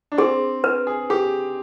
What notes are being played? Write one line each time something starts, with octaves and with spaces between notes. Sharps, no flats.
D4
C4 G#4
B4
G#4
G4 G#4